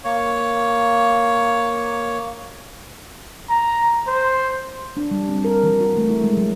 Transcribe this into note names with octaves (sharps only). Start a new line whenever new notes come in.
A#3 C#5
A#5
C5
D4
G3
C4
A#4
E3
F#4
A3
E4
G#3
F#3